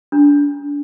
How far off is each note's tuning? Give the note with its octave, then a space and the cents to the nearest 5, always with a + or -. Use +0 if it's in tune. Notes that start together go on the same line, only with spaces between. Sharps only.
D4 -30